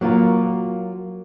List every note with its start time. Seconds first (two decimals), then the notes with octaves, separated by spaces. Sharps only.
0.01 F#3 A#3 F4 A#4